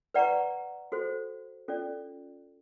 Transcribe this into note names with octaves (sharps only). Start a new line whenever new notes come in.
B4 D5 F#5 A#5 C#6
F#4 A4 C5
C#4 F4 A4 D5